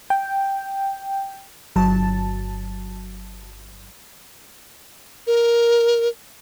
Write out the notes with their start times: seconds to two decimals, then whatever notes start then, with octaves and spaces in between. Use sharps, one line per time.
0.10 G5
1.76 G1 F#3 A5
5.27 A#4